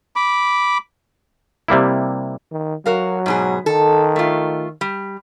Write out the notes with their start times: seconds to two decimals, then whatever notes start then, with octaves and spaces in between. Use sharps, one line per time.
0.16 B5 D6
1.68 C3 G3 A#3 E4
2.51 D#3
2.86 F#3 F#4 A#4 F5
3.26 G#2 B2 G#4
3.66 D#3 A4
4.16 A3 F4
4.81 G3